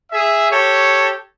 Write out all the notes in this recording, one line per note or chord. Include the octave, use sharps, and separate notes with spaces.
G#4 E5
G4 A4 C#5